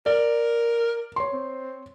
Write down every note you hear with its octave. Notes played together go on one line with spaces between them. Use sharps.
A#4 D5
C#5 C6
C4